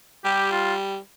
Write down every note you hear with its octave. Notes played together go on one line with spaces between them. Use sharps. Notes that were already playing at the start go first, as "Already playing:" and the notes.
G3 G4
F4